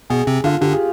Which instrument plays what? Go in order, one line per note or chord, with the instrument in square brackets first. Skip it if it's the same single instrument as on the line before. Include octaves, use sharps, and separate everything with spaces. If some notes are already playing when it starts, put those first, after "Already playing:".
[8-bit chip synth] B2 B3 [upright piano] G#4
[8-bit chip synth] C3 C4
[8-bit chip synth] D3 D4 [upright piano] F4
[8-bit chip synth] D3 D4 [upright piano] G4
[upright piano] G#4